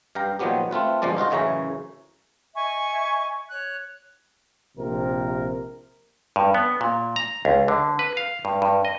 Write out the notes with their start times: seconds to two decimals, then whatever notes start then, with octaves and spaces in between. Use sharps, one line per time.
0.15 G2 F5 G5 A#5
0.39 A#2 D#3 F3 F#3 B3 G4
0.71 A3 C4 F4 B4
1.02 G1 G2 A#2 F3 G#3 D5
1.17 D#4 F4 F#4 D#5
1.30 F#2 A2 C#3 E3 C#5 A#5
2.55 D#5 E5 G#5 C#6
3.50 C#5 F#6
4.78 A#1 C3 A#4
6.36 G2
6.54 B3
6.81 A#2
7.16 A#5
7.45 C#2
7.68 D3
7.99 B4
8.17 F5
8.45 G2
8.62 G2
8.85 D#5